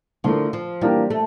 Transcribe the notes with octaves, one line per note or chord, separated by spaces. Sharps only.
D3 F3 A3 E4 A#4
F3
E3 G3 A#3 D4 G4 A#4
A3